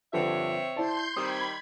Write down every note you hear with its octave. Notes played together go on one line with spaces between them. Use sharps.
G2 D3 F3 C4 C#5 E5
E4 C5 D5 A5 C6 G6
D#3 G3 C4 B5 D#6 G#6